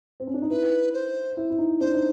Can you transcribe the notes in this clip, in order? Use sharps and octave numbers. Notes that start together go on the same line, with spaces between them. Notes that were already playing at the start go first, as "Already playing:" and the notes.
C4
C#4
D4
D#4
E4 B4
C5
E4
E4
D#4
D4 C5
D#4